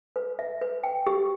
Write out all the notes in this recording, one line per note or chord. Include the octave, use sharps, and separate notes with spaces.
B4
E5
B4
G5
G4